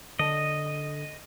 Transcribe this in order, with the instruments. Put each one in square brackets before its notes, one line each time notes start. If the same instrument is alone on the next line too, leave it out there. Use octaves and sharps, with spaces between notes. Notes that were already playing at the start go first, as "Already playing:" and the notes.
[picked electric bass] D3 [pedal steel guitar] D#5